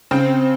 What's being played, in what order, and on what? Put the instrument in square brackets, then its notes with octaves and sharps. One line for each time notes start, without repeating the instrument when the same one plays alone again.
[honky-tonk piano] C#3 [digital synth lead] C4